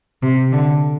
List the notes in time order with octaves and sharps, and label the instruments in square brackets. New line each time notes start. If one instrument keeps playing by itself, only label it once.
[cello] C3
D3